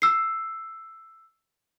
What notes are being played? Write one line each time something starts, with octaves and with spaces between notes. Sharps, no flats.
E6 C7